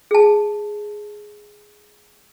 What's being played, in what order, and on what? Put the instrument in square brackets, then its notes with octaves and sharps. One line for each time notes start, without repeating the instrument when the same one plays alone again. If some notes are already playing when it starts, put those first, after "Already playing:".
[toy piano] G#4 A5